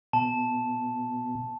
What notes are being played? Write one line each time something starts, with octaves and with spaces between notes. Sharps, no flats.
B2 A5